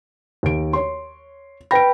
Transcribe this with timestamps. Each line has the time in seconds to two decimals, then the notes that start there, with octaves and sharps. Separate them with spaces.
0.43 D#2 D7
0.73 C#5 C6
1.71 B4 G5 B5 A#6 D7